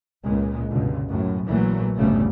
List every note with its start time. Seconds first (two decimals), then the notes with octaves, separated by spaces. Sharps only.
0.23 C#2 A#2 G#3
0.68 C#2 G2 B2 D3
1.08 B1 F#2 A2
1.46 A#1 A#2 E3 F#3 A3
1.95 G1 D2 A2 C#3 G3 A3